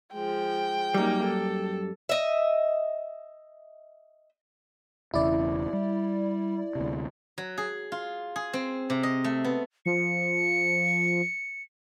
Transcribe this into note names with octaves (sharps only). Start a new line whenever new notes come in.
F3 G#3 G5
F#2 G3 A#3 D#4
A4
D#5 E5
E1 E2 C#3 E4 D5
G3
D2 C3
F#3
G#4
F4
G#4
C4
C3
D#5
A3
B3
F3 C#7